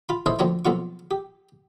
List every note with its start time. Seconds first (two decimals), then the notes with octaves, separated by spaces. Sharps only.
0.09 F4 B5
0.26 D#4 E4 A4 A#4 C5 C#5
0.39 D2 F3 A#3 C#5 A#5
0.65 B1 F2 A#3 F4 C#6
1.11 G4